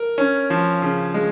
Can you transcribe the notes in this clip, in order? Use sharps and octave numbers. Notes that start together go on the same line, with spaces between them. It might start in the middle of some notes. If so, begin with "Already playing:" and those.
Already playing: A#4
C#4
F3
C#3
G#3